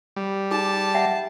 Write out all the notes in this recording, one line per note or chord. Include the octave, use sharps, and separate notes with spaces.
G3
D#4 G#4 A5
E5 F#5 G5